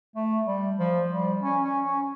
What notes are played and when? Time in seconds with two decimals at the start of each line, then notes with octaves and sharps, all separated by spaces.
0.15 A3
0.47 G3
0.79 F3
1.10 G3
1.42 C#4
1.63 C#4
1.84 C#4